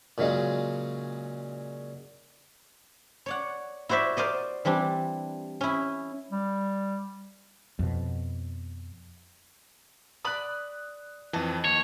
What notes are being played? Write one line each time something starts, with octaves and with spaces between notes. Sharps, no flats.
A#2 C#3 F#3 G#3
C#5 D5 F#5
E4 F#4 C5 D5 E5
A#4 C5 D5 D#5
E3 G3 C4 D4
C#4 E4
G3
F2 B2
D5 B5 D6 D#6 F#6
F2 E3 B4 D#5 A5
D#2 C#5